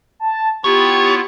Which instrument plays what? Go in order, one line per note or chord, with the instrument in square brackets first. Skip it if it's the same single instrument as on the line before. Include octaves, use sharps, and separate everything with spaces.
[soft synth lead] A5
[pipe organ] B3 E4 F4 [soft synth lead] G4 [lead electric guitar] C#5